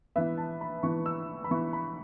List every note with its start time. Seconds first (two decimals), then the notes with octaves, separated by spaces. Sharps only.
0.16 E3 B3 E5
0.37 A5
0.61 B5
0.83 E3 B3 C#6
1.06 E6
1.44 B5
1.51 E3 B3 C#6
1.73 B5